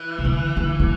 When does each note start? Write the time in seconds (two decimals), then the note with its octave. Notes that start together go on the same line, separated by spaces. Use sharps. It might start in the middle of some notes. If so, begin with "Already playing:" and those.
Already playing: E3
0.18 C3
0.25 D3
0.57 D3
0.79 D3